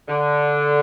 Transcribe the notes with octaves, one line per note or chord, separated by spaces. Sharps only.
D3